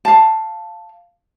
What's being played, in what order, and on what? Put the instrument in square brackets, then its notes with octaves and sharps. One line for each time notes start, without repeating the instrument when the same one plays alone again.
[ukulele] F5 A5